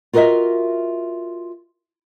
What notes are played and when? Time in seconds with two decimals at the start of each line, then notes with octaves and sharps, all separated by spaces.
0.13 F4 F#4 A#4 B4 D#5 E5